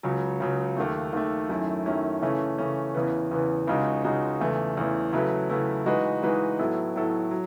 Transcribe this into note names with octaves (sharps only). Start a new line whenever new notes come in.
C#2 C#3 F#3
C#2 C#3 F#3
D#2 D#3 A3
D#2 D#3 A3
F#2 D#3 A3 C#4 E4
F#2 D#3 A3 C#4 E4
C#3 E3 A3 C#4
C#3 E3 A3 C#4
E2 C#3 E3 B3
E2 C#3 E3 B3
C#2 C#3 G#3 D#4 F#4
C#2 C#3 G#3 D#4 F#4
E2 C#3 E3 A3
E2 C#3 E3 A3
C#3 F#3 A3 E4 B4
C#3 F#3 A3 E4 B4
E3 G#3 D#4 F#4 B4
E3 G#3 D#4 F#4 B4
A2 F#3 B3 E4 A4
A2 F#3 B3 E4 A4
F#3